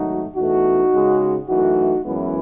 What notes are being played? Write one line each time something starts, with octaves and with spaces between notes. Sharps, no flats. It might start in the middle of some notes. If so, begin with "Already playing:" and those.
Already playing: G#1 F#3 A3 D#4 F#4
E2 B2 A3 D#4 F#4
C#2 C#3 G#3
F#2 E3 A3 D#4 F#4
F#2 E3 G#3 B3 C#4 E4